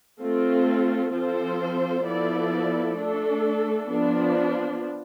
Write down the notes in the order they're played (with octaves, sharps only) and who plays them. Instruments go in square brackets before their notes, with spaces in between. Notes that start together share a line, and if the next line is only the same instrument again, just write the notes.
[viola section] A3 C4 F4
F3 C4 F4 A4 C5
F3 B3 E4 A4 D5
A3 D4 A4
F3 B3 D4